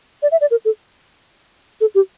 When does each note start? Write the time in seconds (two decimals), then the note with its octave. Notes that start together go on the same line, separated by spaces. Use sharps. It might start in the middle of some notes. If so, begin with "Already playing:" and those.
0.23 D5
0.32 E5
0.41 D5
0.51 A#4
0.65 A4
1.81 A4
1.95 G4